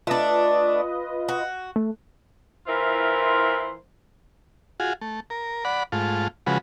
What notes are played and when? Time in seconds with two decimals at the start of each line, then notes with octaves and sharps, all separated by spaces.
0.07 A3 D4 F4 B4 D#5
1.29 F#4
1.76 A3
2.67 E3 E4 F4 A#4 C5
4.80 F4 F#4 G#4
5.01 A3
5.30 A#4
5.65 D5 F#5 B5
5.92 G#2 A3 F4
6.47 C#3 F3 G#3 F#4 B4